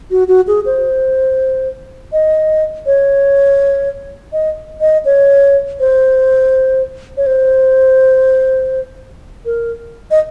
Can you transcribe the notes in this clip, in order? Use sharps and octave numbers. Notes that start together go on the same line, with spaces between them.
F#4
F#4
G#4
C5
D#5
C#5
D#5
D#5
C#5
C5
C#5
C5
A#4
D#5